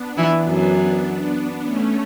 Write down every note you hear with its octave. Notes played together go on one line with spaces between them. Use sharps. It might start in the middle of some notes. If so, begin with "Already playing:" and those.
Already playing: B3 D4
E3 E4
F#2 F#3
A3 C#4